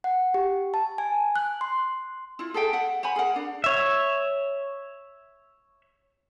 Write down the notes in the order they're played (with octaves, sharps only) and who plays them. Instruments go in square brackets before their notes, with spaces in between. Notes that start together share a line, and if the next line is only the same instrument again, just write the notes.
[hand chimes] F#5
G4
A5
G#5
F#6
C6
[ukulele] E4 F4
G#4 A4 E5 G5
E5 F#5
C5 F#5 G#5 B5
G#4 A#4 F#5
D4
[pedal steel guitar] C#5 E5